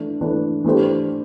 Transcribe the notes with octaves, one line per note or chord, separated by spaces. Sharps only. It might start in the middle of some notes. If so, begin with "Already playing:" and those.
Already playing: E3 A3 D4
E3 A3 D4
E3 A3 D4 G4 C5